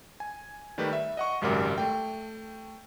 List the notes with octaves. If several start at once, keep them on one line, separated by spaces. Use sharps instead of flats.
G#5
D#3 G3 A3 G4 B4
E5
D#5 F#5 C#6
G#1 C#2 F#2 G3 A#4 D6
A3 G5